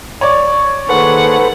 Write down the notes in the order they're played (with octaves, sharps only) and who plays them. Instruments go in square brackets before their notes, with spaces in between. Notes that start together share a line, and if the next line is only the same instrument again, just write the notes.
[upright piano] C#5 D5
[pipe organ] D#3 A#3 G#4 [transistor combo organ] A4 B4 C5 [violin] F#5